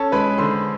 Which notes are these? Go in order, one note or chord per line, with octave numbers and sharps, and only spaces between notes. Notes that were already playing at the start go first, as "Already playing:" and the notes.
Already playing: C#4 A4 A5
G#3 B4 B5
D3 C5 C6